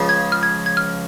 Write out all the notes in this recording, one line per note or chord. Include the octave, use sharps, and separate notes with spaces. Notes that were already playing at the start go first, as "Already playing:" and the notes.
Already playing: C#2 C#3 F3
G#6
F6
G#6
G#6
F6